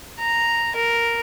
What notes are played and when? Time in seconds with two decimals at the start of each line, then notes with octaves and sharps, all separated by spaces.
0.19 A#5
0.75 A#4